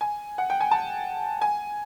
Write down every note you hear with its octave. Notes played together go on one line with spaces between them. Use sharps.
G#5
F#5
G5
G#5
A5
G#5